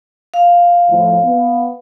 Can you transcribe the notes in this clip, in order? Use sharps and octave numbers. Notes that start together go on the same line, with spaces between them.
F5
A2 F3
B3